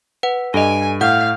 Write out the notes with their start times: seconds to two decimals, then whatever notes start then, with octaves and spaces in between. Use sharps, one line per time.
0.23 B4 F#5
0.54 G2 A4 D#5 G#5 D7
1.01 A2 F5 F#5 G6